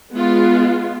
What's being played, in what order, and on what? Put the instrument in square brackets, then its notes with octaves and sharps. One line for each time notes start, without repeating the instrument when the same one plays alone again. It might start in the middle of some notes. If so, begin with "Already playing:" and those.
[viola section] G#3 B3 F4